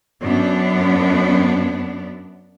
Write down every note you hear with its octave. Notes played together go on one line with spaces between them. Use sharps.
F#2 B3 D4